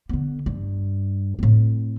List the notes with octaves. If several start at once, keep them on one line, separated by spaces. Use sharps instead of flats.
D3 B3
G2
A2 C4